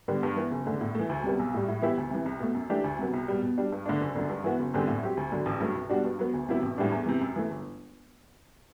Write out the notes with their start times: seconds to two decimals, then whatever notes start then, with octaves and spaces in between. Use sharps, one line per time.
0.08 D3 G3 B3
0.23 G2
0.36 E3 B3
0.51 F#1
0.65 E2 D3 A3
0.81 A2
0.95 E3 A3
1.09 D2
1.24 C3 G3 B3
1.39 B1
1.54 A2 G3
1.68 A2
1.82 E3 B3 E4 G4
1.98 D2
2.11 C3 E3
2.26 C2
2.40 B2 A3
2.55 F#2
2.69 E3 A3 D4 G4
2.84 D2
2.99 C3 F#3 B3
3.13 C2
3.28 B2 G3
3.42 B2
3.58 G3 D4
3.72 G2
3.86 D3 A3 D4
4.01 F#1
4.16 F#2 D3
4.29 G2
4.44 E3 B3 F#4
4.60 F#1
4.74 E2 D3 G3 C4
4.87 A2
5.03 F#3 C4 G4
5.17 D2
5.32 D3 F#3
5.46 A1
5.60 G2 F#3 A3
5.75 C2
5.89 B2 G3 D4 F#4
6.05 G2
6.19 F#3 B3
6.34 D2
6.49 C3 F#3 B3 E4
6.62 A1
6.78 A2 E3 G3 D4
6.92 E2
7.06 C3 E3
7.21 F#2
7.36 E3 A3
7.50 G1